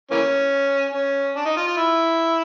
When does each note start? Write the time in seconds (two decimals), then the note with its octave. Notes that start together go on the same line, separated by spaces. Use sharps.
0.11 E3 A#3 C#4
0.94 C#4
1.36 D4
1.45 D#4
1.57 F4
1.67 F4
1.77 E4